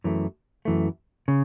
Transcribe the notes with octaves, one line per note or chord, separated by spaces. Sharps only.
F#2 E3 A3
F#2 E3 A3
C#3